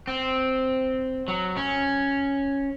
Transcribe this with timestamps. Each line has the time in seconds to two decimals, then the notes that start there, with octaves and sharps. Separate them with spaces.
0.07 C4
1.28 F#3
1.57 C#4